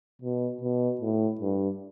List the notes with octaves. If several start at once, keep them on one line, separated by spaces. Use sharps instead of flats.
B2
B2
A2
G2